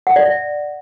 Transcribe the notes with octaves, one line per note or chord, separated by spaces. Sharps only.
F#5
D5
E5